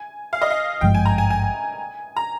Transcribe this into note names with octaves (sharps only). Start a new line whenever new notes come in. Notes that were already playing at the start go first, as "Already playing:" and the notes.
Already playing: G#5
F5
D#5
F5
G#1 G2 F3 G#3 G5
G#5
A#5
G#5
G#5
A#5